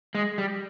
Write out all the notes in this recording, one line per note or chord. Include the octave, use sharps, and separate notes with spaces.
G#3
G3